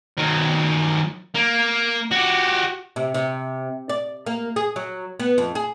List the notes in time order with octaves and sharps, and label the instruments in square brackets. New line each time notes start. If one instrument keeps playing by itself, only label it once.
[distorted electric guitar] D#3 F#3
A#3
F#4 G4
[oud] C3
C3
D5
A#3
G#4
F#3
B3
F2
G#4